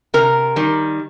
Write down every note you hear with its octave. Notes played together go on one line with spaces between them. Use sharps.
C3 A#4
D#3 G3